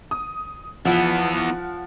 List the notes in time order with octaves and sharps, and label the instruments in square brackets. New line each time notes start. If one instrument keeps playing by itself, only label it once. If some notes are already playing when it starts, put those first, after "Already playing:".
[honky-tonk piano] D#6
[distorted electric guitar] E3 B3 [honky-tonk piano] F3 F#5